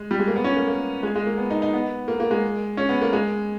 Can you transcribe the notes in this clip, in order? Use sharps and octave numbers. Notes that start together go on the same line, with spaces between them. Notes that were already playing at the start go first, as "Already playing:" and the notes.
Already playing: G#3
G3
G#3
A#3
B3
C#4
A#3
A#3
G#3
G#3
A#3
B3
D#4
D#4
B3
A#3
A#3
G#3
C#4
B3
A#3
G#3